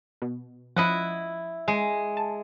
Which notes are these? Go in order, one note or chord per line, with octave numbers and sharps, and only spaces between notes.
B2
F3 E4 D#5 F#5
G#3
A5